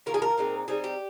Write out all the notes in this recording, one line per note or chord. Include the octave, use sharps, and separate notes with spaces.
D#3 A#3 F4 A#4
G#4
A#4
A#2 G#3 C4 D#4
G3 C4 D#4 G#4
G4